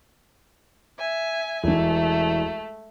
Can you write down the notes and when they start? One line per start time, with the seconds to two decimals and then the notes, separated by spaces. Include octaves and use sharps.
0.98 E5 G#5
1.64 E1 E3 A3